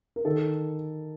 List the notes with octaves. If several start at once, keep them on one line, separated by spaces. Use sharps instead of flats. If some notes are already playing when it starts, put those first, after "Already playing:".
A#4
D#3 A4